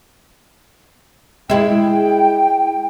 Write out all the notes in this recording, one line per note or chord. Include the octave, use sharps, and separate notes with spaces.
G#3 E4 G5